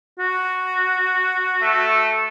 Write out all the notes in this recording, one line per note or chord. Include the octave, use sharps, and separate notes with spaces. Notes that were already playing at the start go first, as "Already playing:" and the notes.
F#4
A3